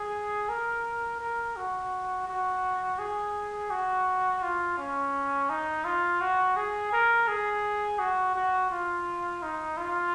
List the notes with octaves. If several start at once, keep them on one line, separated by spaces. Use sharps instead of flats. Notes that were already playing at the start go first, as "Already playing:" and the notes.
Already playing: G#4
A#4
A#4
F#4
F#4
G#4
F#4
F4
C#4
D#4
F4
F#4
G#4
A#4
G#4
F#4
F#4
F4
D#4
F4